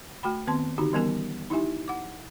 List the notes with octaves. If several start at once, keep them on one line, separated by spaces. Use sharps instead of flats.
A3 F#4 G5 B5
D#3 B3 C4 A5 C6
D3 D#3 D#4 F#4 G4
E3 G3 B3 C#4 A#4 G#5
D#4 E4 G4 E5 G#5
F#5 D6